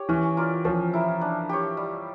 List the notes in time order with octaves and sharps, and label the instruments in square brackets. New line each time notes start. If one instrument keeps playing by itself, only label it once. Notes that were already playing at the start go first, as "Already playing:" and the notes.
Already playing: [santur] G4 C#5
[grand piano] E3 [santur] C#4
[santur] F4 A#4 D5
[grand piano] F3 [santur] C#4
[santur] E4 A#4
D4
G4 C#5
G3